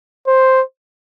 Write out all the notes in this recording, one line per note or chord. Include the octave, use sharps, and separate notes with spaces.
C5